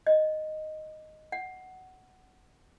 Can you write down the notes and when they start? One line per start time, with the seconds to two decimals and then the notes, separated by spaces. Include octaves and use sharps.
0.07 D#5
1.32 F#5